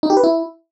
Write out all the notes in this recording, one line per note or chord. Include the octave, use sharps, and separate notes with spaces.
D#4
G4
B4
E4